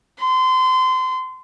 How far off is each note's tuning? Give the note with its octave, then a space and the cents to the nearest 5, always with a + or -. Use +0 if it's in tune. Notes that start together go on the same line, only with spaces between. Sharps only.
C6 -25